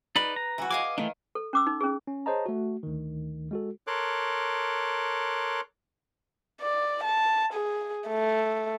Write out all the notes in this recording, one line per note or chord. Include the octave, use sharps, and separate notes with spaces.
D#4 B4 D5 B5
A#5
E3 F#4
D#5 F5 G#5 D6
D#3 E3 A3 D4
A4
C#4 D6 E6
D#4
C#4 G#4
C#4
G#4 C5 C#5 D#5 A5 A#5
A3 F#4
D2 D#3
G#3 F#4 A4
A4 A#4 C#5 C6 D6 F#6
D5
A5
G#4
A3